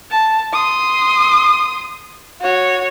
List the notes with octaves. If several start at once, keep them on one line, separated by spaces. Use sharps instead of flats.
A5
C6 D#6
F#4 C#5